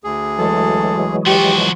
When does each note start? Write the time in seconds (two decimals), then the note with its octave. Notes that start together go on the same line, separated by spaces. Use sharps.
0.04 D2 G#4
0.39 E3 F#3 G#3 A4
1.26 F3 F#4 G4